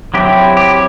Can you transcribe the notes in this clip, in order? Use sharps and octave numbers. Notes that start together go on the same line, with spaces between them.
F#3 C4 E4 G4
G4